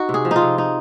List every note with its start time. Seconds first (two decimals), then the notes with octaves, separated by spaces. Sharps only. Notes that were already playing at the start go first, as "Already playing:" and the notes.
Already playing: D#4 F#4
0.09 C3
0.14 G#4
0.25 F3
0.31 D#4 F4
0.41 C3
0.58 D#4